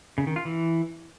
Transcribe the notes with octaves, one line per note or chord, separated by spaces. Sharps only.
C#3
D#3
F4
E3